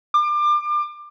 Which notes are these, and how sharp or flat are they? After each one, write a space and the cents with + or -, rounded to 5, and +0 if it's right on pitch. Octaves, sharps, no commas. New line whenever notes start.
D6 +30